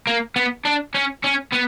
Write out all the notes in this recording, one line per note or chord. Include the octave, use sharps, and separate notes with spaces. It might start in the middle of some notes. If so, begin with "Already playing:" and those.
A#3
B3
D4
C#4
C#4
B3